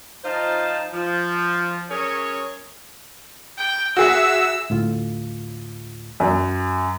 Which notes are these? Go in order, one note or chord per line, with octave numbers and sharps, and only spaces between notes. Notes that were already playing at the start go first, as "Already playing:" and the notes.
F3 D#4 F4 C5 F5 A5
F3
F#3 C#4 G#4 A#4 C#5
G5
F#4 G#4 E5 E6
D2 A2 F4
F#2